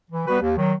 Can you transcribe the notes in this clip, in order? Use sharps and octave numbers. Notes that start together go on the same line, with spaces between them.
E3
G3 B3 F#4 B4
D#2
D#3 F#3